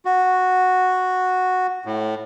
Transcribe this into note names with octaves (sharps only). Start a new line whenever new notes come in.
F#4
A2